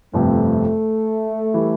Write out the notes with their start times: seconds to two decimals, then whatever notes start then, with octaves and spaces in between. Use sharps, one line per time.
0.14 G1 F2 C3 A3
1.54 E3 G3